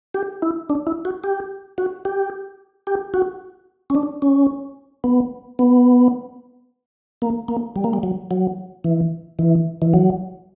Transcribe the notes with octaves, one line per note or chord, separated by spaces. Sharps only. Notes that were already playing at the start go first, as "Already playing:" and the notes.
G4
E4
D4
E4
F#4
G4
F#4
G4
G4
F#4
C#4
D4
C#4
B3
B3
A#3
A#3
G3
A#3
G3
F#3
F#3
E3
E3
E3
F#3